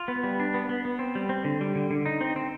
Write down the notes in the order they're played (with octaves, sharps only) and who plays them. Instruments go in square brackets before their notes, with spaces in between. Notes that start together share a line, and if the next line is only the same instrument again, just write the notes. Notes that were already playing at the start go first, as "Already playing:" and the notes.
Already playing: [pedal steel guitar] F4
B3
G3
D4
B3
B3
B3
C4
G3
C4
D3
G3
D3
D3
D#4
C4
C4